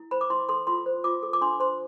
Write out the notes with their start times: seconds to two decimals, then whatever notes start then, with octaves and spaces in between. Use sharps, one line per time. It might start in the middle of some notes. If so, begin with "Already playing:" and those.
Already playing: E4
0.11 C5 B5
0.21 D6
0.30 E4 C6
0.49 A4 C6
0.67 F4 C6
0.86 C5
1.04 F4 D6
1.23 A4
1.33 D6
1.41 D4 C6
1.60 C5 C6